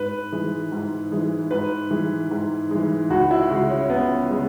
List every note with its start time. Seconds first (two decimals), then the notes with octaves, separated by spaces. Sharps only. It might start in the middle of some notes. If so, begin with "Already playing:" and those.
Already playing: G#2 B4
0.32 E3 G#3
0.72 G#2
1.12 E3 G#3
1.51 G#2 B4
1.91 E3 G#3
2.31 G#2
2.71 E3 G#3
3.10 C#2 F#4
3.31 E4
3.50 C#3 G#3 F#4
3.69 C#4
3.89 C#2 B3
4.29 C#3 G#3